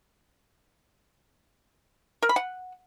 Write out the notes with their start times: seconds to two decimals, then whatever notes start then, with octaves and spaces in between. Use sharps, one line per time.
2.22 A#4
2.29 B5
2.36 F#5